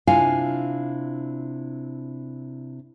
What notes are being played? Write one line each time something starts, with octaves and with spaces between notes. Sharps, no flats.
C3 D4 E4 F4 F5 G#5